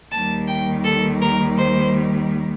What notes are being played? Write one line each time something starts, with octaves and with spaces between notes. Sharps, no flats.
D#2 D#3 G3 A5
G5
A4
A#4
C5